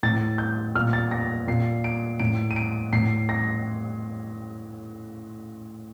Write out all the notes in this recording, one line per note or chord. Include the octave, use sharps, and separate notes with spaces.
A2 A6
G6
A#2 F6
A6
A#6
A#2 C7
D7
A2 D7
D#7
D7
A2 C7
A#6